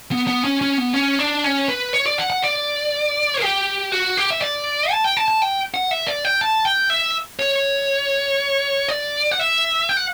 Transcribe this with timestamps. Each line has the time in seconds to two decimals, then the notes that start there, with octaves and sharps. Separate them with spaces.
0.11 B3
0.27 B3
0.44 C#4
0.61 C#4
0.78 B3
0.94 C#4
1.19 D4
1.44 C#4
1.68 B4
1.93 C#5
2.06 D5
2.18 F#5
2.30 F#5
2.43 D5
3.42 G4
3.92 F#4
4.17 G4
4.31 E5
4.41 D5
4.91 A5
5.04 G5
5.17 A5
5.28 A5
5.42 G5
5.74 F#5
5.91 E5
6.07 D5
6.25 G5
6.41 A5
6.65 G5
6.90 E5
7.39 C#5
8.89 D5
9.31 F#5
9.39 E5
9.89 G5
9.97 F#5